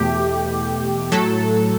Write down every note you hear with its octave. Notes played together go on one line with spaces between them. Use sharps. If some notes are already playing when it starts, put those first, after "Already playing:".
Already playing: E2 B2 A3 G4
A2 F#3 A3 A4